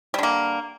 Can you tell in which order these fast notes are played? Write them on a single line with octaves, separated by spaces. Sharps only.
G3 D3 A#3